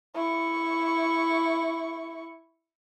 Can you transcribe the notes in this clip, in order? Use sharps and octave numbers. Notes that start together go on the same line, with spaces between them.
E4 C#6